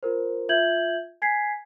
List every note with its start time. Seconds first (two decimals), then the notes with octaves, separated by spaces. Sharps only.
0.03 F4 A#4 C5
0.49 F4 E5 G6 G#6 F#7
1.22 G#5 G#6 B6 C7